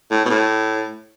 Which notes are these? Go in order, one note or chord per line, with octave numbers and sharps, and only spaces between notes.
A2
B2
A2